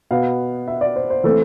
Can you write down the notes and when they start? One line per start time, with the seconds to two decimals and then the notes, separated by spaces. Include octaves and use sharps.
0.11 B2 B3 F5
0.68 E5
0.81 D5
0.96 C5
1.10 C5
1.24 E3 A3 C4 A4